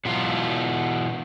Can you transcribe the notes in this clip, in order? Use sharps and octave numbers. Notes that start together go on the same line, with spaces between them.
B2 E3 F#3 F4